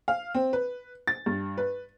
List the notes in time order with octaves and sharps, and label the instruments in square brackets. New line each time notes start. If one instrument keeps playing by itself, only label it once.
[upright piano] F5
C4
B4
A6
G2
B4